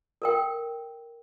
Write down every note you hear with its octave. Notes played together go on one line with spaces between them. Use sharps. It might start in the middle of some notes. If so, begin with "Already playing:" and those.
A4 A#4 G5